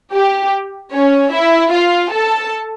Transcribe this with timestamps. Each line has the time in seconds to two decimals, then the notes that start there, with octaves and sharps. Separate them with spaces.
0.13 G4
0.93 C#4 C#5
1.32 E4 E5
1.72 F4 F5
2.12 A4 A5